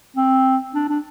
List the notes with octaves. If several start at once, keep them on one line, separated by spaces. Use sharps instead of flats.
C4
D4
D4